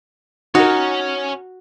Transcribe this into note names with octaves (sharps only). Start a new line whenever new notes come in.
C#4 D#4 F#4 A#4 C#5